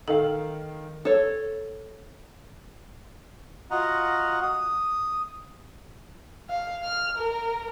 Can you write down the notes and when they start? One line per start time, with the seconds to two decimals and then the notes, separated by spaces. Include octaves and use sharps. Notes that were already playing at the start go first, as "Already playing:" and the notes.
0.08 D#3 A4 F5
1.05 A4 C#5
3.71 F4 F#4 D#5 F#5 A#5
4.43 D#6
6.50 F5
6.83 F6
7.17 A#4